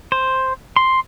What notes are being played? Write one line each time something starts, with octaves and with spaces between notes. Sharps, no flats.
C5
C6